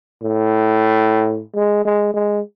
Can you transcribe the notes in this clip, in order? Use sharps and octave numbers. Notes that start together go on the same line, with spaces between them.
A2
G#3
G#3
G#3